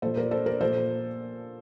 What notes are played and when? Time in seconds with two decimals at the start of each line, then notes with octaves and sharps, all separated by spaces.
0.02 A#2 F3 A4 C5
0.17 A#4 D5
0.31 A4 C5
0.46 A#4 D5
0.61 A#2 F3 A4 C5